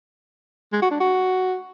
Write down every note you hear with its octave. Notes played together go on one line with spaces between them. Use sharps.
G#3
F#4
D4
F#4